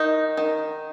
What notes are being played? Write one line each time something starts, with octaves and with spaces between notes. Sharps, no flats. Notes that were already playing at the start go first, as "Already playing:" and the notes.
Already playing: D#3 D#4
D#3